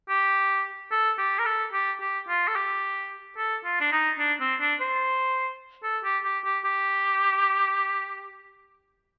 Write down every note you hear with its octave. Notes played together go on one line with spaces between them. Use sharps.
G4
A4
G4
A#4
A4
G4
G4
F4
A4
G4
A4
F4
D4
D#4
D4
C4
D4
C5
A4
G4
G4
G4
G4